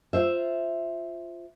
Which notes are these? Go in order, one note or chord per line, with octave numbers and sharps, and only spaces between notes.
F4 C5 E5